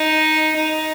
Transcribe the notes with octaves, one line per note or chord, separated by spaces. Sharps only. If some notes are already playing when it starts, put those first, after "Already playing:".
Already playing: D#4
D#4